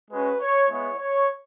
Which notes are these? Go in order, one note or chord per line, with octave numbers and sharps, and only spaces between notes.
G#3 C#4 F#4 B4
C#5
G#3 B3 E4 C#5
C#5